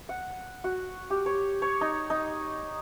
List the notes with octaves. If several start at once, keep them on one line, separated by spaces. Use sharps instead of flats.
F#5
F#4
G4
C#5
C#5
D#4
D#4